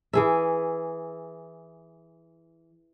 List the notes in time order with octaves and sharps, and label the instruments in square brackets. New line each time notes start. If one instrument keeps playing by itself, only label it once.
[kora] E3 G#4 E5